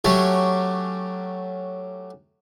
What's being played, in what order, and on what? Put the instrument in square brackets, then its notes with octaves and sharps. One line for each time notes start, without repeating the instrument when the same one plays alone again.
[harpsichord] F#3 A3 C#4 G4